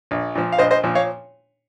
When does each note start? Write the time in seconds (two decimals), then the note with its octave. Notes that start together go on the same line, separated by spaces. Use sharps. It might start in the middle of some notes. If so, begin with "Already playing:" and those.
0.11 A#1
0.35 A#2 F3
0.52 F5
0.58 A#1 C5 D#5
0.71 C5 D#5
0.83 A#2 F3
0.95 C#5 F5